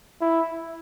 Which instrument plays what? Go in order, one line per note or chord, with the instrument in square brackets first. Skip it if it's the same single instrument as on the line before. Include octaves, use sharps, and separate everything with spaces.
[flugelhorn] E4